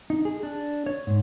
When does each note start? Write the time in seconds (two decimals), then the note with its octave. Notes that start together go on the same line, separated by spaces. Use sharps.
0.10 D#4
0.25 G#4
0.43 D4
0.86 C#5
1.07 G#2